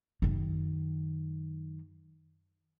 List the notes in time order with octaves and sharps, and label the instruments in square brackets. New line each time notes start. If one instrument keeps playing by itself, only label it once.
[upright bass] F#2 D#3